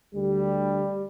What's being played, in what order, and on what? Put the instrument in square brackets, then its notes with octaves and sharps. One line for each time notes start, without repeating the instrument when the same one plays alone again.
[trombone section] D2 D3 G3